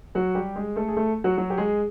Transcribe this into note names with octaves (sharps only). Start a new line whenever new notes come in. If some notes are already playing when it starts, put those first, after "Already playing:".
F#3 F#4
G3 G4
G#3 G#4
A3 A4
G#4
A3 A4
F#3 F#4
F#3 F#4
G4
G#3 G#4